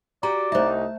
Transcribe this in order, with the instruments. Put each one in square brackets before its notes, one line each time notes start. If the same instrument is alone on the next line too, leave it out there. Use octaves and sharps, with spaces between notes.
[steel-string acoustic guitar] F#4 G4 [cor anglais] D5 [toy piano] A#5
[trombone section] C2 D#4 [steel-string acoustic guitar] A3 A5 [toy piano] C5 E5